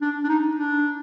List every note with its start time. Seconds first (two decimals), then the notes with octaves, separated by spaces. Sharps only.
0.02 D4
0.24 D4
0.29 D#4
0.57 D4